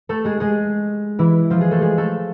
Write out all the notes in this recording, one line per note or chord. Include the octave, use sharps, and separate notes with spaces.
A3 A4
G#3 G#4
G#3 G#4
E3 E4
F3 F4
G#3 G#4
A3 A4
G#3 G#4
A3 A4